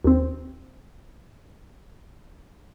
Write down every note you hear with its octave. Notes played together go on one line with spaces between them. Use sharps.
D#2 C4